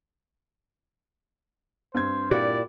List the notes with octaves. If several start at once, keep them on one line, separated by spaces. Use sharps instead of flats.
G2 C4 C5 G#6
A#2 E4 F#4 G4 D5